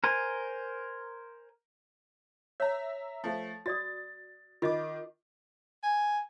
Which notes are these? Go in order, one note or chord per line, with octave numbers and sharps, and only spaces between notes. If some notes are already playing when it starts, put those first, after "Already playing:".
A#4 C5 G#5
C#5 E5 A#5
F3 A3
F#4 D5 D#6 A6
D#3 F4 D#5 D6
G#5